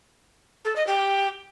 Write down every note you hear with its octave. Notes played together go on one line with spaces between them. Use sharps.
A4
D#5
G4